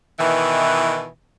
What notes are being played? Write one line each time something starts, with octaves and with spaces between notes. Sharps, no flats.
B2 D#3 E3